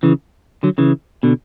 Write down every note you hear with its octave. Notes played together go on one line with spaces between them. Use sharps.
C#3 E3
D3 F#3
C#3 E3
B2 D3